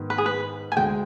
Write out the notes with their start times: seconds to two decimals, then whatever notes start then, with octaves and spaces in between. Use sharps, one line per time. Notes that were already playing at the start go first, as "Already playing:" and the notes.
Already playing: G#2 D#3 B3
0.10 B4
0.18 G#4
0.26 B4
0.72 G#5
0.76 D2 D3 G#3 G5